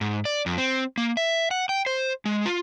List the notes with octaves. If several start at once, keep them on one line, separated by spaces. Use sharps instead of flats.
G#2
D5
F2
C4
A#3
E5
F#5
G5
C5
G#3
F4